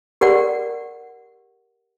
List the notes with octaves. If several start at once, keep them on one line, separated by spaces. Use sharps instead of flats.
G4 A#4 D5 F#5